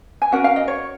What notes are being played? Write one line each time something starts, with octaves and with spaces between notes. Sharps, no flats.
G#5
C#4 F#4 A#4 F#5
F5
D#5
C#5